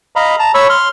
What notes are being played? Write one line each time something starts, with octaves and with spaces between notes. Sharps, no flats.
D#5 F5 A#5 B5
A5 A#5
C#5 B5 C#6 E6
C6 F6